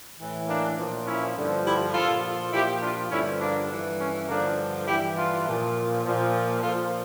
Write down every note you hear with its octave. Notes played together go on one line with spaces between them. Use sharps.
A2 E3
A#3 D4
A#2 F3
C#4 E4
G2 D3 F3
E4 G4
A#2 F3 F4 A4
A#2 F3 E4 G4
D4 F4
G2 D3 F3 C#4 E4
A#3 D4
G2 E3
C#4
G2 D3 F3 A#3 D4
G2 E3 E4 G4
D4 F4
A#2 F3
A#2 F3
A#2 F3 F4 A4